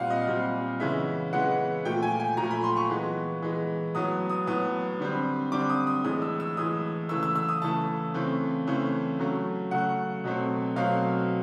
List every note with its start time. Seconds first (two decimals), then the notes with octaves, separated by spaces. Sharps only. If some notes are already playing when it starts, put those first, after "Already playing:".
Already playing: A#2 G3 C4 F5 F#5
0.10 D#5
0.28 A#2 G3 C4
0.80 C#3 E3 G#3 B3 E5
1.33 C#3 E3 G#3 B3 F#5
1.85 A#2 F3 A3 G5
2.03 G#5
2.20 G#5
2.37 A#2 F3 A3 A#5
2.51 B5
2.64 C6
2.77 C#6
2.90 E3 G#3 B3
3.42 E3 G#3 B3
3.95 A2 F#3 B3 D#6
4.30 D#6
4.47 A2 F#3 B3 D#6
5.00 D3 G3 C4
5.52 D3 G3 C4 D6
5.70 D#6
5.87 D#6
6.04 A2 E3 G#3 D#6
6.22 E6
6.40 E6
6.57 A2 E3 G#3 D#6
7.09 C#3 E3 A3 E6
7.23 E6
7.35 E6
7.49 D#6
7.62 C#3 E3 A3 A5
8.14 C#3 E3 A3 C4
8.67 C#3 E3 A3 C4
9.19 C#3 F#3 A3
9.71 C#3 F#3 A3 F#5
10.24 B2 F#3 A3 C4
10.76 B2 F#3 A3 C4 F5